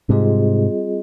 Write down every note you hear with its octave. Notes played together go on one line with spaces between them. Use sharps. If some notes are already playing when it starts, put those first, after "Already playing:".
G#2 C3 G3 C4 F4 G#4 D#5